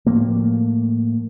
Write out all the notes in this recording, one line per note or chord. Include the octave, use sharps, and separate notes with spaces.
A2 F3 A3 A#3